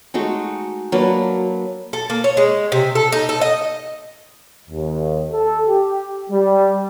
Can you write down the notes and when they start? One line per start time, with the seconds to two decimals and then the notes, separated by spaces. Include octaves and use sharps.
0.14 G#3 A3 D#4 F#4
0.92 F#3 A#3 D4 B4
1.93 A4
2.10 A#3
2.24 C#5
2.37 G#3
2.72 C3
2.95 A4
3.12 D#4
3.29 A4
3.41 D#5
4.70 D#2
5.31 A4
5.68 G4
6.31 G3